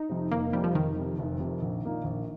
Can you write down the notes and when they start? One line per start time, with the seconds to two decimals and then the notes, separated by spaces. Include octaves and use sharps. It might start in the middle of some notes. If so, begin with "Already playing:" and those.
Already playing: D#4
0.09 F2 C3
0.31 F1 A#3
0.53 F2 C3 G3
0.64 F3
0.74 F1 D#3
0.97 F2 C3
1.19 F1
1.40 F2 C3
1.62 A#1
1.83 A#2 A#3 D#4
2.04 A#1